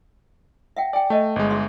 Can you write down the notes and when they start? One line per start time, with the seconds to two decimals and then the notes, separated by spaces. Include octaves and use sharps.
0.77 E5 F#5 G5
0.93 D5 G5 G#5
1.10 A3 D#5 E5 A5
1.36 G1 G#3
1.50 G#4 E5 C6